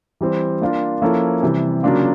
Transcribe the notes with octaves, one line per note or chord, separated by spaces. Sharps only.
E3 G3 C4
A#3 D4 F4 A#4
F3 A#3 C#4 E4 A4
C3 E3 G3
C#3 F#3 A#3 D4 F4